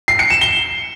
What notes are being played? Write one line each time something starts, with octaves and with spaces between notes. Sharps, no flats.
C7
C#7
E7
G7